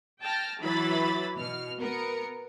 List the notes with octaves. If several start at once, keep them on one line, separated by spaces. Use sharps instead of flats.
G5 A5 F6 A#6
E3 F#3 B5 A6
B2 F6
B3 A#4 C#7